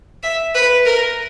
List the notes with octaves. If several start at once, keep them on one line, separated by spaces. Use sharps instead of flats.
E5
B4
A#4